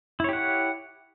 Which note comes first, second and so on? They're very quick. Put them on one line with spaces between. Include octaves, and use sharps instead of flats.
E4 C#5 G4 F#5